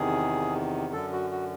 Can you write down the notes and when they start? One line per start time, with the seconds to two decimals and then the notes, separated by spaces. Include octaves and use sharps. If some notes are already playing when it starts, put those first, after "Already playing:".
Already playing: E2 C3 D#3 G#4
0.93 F#2 D3 A4
1.13 F#4
1.31 F#4